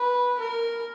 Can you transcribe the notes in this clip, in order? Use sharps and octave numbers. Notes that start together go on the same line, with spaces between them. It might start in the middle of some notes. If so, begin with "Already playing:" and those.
Already playing: B4
A#4